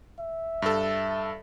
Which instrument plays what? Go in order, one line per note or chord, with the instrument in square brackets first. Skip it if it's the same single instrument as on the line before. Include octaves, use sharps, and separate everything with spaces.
[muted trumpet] E5
[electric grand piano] G2 A4